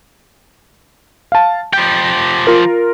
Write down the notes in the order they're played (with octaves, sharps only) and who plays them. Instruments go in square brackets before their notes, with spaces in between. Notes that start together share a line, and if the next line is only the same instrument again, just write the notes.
[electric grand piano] F5 A5
[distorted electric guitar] F3 G4 [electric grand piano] G6
[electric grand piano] F4 A#4